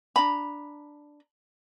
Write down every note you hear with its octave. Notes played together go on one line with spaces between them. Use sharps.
D4 A#5 B5